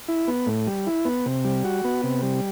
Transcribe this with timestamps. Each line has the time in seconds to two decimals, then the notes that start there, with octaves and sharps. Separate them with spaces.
0.08 E4
0.27 B3
0.46 A2
0.67 G3
0.87 E4
1.05 B3
1.26 C3
1.45 G3
1.65 F#4
1.84 B3
2.04 C3
2.23 G3